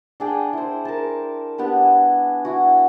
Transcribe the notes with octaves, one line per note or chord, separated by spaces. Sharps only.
D4 G#4 G5
E4 C5
A#4 A5
B3 D4 G4 B4
G#5
E4 F#4